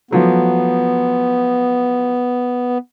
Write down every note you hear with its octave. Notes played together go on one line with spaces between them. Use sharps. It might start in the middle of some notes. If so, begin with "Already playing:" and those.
F3 F#3 A3 B3